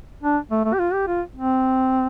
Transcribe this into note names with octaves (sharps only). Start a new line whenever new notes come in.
D4
A3
A3
G4
F4
G4
F4
C4